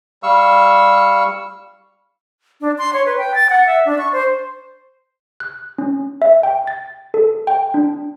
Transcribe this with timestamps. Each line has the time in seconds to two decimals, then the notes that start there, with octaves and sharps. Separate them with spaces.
0.23 G3 F5 C#6 E6
2.61 D4
2.78 C6
2.93 C#5
3.06 B4
3.18 G5
3.35 A6
3.50 F#5
3.66 E5
3.86 D4
3.98 C#6
4.12 C5
5.40 F#6
5.78 C#4
6.22 E5
6.43 G5
6.67 A6
7.14 A4
7.47 G5
7.74 D4